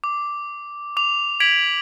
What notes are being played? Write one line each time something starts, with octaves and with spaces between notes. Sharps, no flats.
D6
D6 F7
G#6 B6 D7 F7 F#7